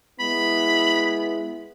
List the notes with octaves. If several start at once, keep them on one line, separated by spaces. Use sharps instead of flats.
G#3 B3 E4 B5